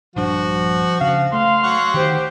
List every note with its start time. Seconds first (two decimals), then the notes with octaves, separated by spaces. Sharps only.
0.16 A#1 G2 F3 D4 F#4
1.01 D2 C#3 F5
1.33 A3 F5 C6
1.63 F#3 F#5 C#6
1.94 D2 D#3 G4 C5